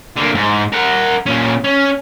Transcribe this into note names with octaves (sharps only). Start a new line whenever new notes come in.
D3 A#3
G#2
A#4 F#5
A#2 C#4
C#4